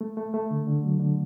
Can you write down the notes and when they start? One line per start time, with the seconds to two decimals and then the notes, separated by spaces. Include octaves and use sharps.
0.01 A3
0.17 A3
0.34 A3
0.51 D3
0.67 D3
0.83 F#3
1.00 D3